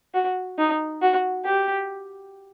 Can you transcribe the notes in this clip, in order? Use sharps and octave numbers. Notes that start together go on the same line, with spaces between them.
F#4
D#4
F#4
G4